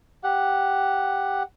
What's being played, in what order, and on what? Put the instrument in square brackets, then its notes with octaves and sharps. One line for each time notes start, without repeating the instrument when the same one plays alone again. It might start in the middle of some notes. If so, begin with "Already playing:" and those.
[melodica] G4 F#5